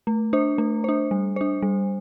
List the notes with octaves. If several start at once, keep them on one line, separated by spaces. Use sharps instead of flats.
A3
D4 C5
A3
D4 C5
G3
D4 C5
G3